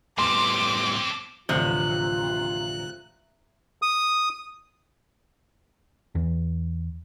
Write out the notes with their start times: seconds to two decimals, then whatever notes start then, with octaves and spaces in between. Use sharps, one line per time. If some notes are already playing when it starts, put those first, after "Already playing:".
0.18 A2 G3 B3 C4 A4 C6 D6
1.49 A1 D2 C3 F3 F4 F#6
3.82 D#6
6.15 E2